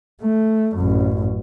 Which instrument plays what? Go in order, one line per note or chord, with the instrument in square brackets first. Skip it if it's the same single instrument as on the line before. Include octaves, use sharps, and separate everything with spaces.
[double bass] A3
A1 F#2